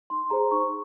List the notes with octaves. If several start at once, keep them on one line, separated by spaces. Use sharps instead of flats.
D#4 C6
G#4 C5 A#5
D#4 C#6